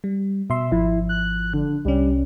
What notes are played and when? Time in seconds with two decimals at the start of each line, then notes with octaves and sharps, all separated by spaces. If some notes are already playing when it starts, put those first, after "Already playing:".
0.04 G3
0.50 B2 E5 C6
0.72 G#1 F3 E4
1.09 F#6
1.53 D3
1.85 C2 G3 C#4